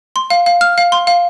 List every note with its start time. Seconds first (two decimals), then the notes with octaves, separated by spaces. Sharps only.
0.16 C6
0.30 F5
0.46 F5
0.61 F6
0.78 F5
0.92 C6
1.07 F5